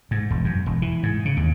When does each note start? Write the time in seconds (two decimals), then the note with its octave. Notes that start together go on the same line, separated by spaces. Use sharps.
0.11 G#2
0.30 E1
0.44 F#2
0.66 E1
0.82 E3
1.03 G#2
1.25 C#3
1.37 D#2